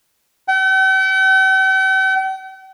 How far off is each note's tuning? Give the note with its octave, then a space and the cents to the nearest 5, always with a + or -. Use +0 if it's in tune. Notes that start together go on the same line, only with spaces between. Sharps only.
G5 -45